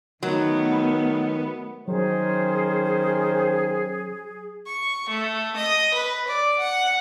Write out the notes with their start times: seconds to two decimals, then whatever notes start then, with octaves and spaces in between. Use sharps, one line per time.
0.23 D#3 F#3 A3 B3
1.88 D#3 F#3 C#4 G#4 C5
4.67 C#6
5.09 A3
5.56 D#5
5.94 B4
6.28 D5
6.59 F#5